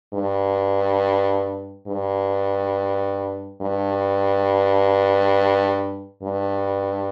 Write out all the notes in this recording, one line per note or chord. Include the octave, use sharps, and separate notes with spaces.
G2
G2
G2
G2